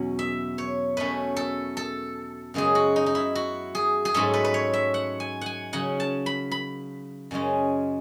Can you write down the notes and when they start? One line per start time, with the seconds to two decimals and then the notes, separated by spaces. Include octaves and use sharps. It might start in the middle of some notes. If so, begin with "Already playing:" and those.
Already playing: E2 B2 F#3 C#4
0.19 E5
0.58 C#5
0.97 B2 A3 C#4 B4
1.36 A4
1.77 A4
2.54 F#2 C#3 G#3 B3 G#4
2.75 F#4
2.96 D#4
3.06 D#4
3.15 E4
3.35 F#4
3.75 G#4
4.05 G#4
4.14 G#2 F#3 A3 C#4 A4
4.34 B4
4.45 B4
4.54 C#5
4.73 E5
4.94 F#5
5.20 G#5
5.41 F#5 G#5
5.73 C#3 F#3 C#4 F#5
6.00 A5
6.26 B5
6.51 B5
7.31 F#2 C#3 G#3 C#4